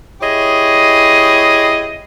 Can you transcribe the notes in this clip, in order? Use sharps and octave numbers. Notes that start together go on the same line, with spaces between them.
E4 G4 G#4 C#5 D#5